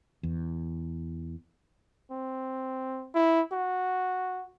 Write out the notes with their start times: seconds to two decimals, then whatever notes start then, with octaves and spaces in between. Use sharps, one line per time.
0.23 E2
2.11 C4
3.14 E4
3.52 F#4